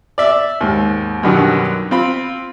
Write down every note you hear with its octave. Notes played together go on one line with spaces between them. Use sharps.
D5 E5
D#2 G#2
F#2 B2 D3 D#3 F#3 G3
C4 F4 B5